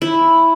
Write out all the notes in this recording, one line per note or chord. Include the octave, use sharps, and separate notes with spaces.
E4